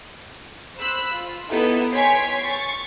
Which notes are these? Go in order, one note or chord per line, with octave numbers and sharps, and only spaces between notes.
C5 B5 E6 F#6
F4
B3 D#4 E4 G4 A4
C#5 G5 G#5 C6 B6 C7
C#6 A6